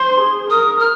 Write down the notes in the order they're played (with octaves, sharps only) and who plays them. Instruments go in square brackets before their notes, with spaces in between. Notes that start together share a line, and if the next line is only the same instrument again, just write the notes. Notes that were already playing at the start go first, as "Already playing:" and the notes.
Already playing: [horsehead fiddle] C5 [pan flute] C6
[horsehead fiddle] G#4
[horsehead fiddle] A#4 [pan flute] D#6
[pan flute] F6